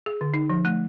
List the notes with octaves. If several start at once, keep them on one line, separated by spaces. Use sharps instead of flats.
G#4
D3
D#4
F3
A3